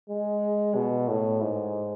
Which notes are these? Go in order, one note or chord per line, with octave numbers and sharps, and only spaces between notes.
G#3
B2
A2
G#2